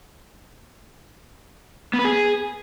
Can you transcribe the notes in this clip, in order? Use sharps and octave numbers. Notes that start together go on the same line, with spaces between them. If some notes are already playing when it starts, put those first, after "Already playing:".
B3
B4
G#4